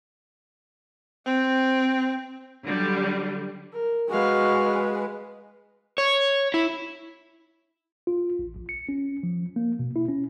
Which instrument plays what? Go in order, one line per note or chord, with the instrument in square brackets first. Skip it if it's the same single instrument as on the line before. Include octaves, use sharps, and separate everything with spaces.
[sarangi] C4
[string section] D3 F#3 G3
[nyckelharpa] A#4
[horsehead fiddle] G#3 B4 [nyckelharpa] F#4 F5
[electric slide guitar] C#5
E4
[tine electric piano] F4
A1
A#1
C#7
C#4
F3
A#3
B2
E4
C#4